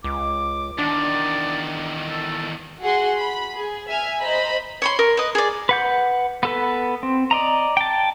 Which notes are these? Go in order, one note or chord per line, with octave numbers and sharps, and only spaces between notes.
C#2 D6
E2 D#3 D4 D5
A4
F#4 G#4 F#5 C6
B5
G#4
E5 G#5 F6
C5 D#5 A#5 B5
C#5 B5 C6
A#4
B4 D#5
G#4 D5
B4 F#5 G6
B3 A4 B4
C4
D5 D#5 A#5
G5 A5